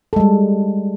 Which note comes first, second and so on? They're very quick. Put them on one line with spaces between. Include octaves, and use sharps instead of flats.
A4 G#3 G3